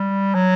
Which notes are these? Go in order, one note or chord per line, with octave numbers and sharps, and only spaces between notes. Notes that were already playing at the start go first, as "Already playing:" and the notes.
Already playing: G3
F#3